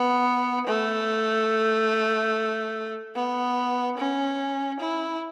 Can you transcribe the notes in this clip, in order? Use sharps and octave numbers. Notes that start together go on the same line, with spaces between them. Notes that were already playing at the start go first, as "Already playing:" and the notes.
Already playing: B3
A3
B3
C#4
E4